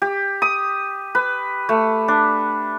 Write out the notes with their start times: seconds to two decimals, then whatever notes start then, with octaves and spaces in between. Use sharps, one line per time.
0.02 G4
0.42 D#6
1.15 B4
1.69 A3
2.08 D4